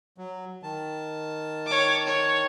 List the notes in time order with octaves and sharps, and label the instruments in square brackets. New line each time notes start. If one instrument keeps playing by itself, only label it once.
[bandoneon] F#3
D#3 A5
[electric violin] C#5 D6
C#5